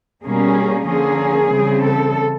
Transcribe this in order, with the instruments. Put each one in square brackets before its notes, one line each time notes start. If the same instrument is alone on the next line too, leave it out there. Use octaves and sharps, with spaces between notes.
[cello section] B2 G3 A#3 C#4 G#4
D3 F3 A#3 C#4 G#4
C#3 E3 G3 C4
A4